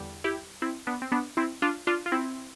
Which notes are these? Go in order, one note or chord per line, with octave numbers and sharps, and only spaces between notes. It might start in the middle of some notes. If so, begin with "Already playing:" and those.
Already playing: E2 D3 G3
E4 G4
C4 E4
B3 D4
C4
B3 D4
C4 E4
D4 F4
D4 F4
F4
C4 E4